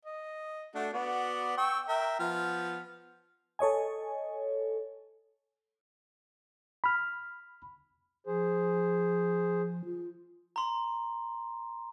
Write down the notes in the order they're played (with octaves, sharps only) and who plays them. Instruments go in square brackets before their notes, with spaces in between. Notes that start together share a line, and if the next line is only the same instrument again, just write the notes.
[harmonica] D#5
A3 D4 F#4
B3 F#4 D5
G5 C#6 E6
A#4 E5 G5
F3 B3 F6
[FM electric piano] A4 C#5 D#5 G#5
[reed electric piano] B5 F6
[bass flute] F3 [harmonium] G#4 C5
[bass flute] F4
[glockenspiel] A#5 C6